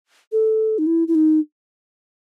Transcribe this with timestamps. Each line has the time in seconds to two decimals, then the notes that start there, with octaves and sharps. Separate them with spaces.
0.32 A4
0.78 D#4
0.87 E4
1.08 E4
1.15 D#4